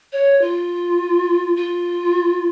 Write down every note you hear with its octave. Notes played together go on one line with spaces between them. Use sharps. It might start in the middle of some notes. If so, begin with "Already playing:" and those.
C#5
F4
F4